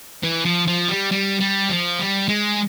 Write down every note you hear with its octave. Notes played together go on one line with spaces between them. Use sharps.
E3
F3
F3
G3
G3
G3
F3
G3
G#3